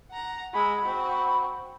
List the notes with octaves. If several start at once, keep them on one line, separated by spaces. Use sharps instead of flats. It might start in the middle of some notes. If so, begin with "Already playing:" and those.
F#5 A#5
G#3 B5 E6
C4 F#4